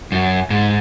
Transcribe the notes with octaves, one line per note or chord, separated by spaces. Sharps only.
F#2
G#2